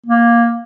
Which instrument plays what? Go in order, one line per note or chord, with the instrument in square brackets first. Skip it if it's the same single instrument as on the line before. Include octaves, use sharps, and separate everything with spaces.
[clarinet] A#3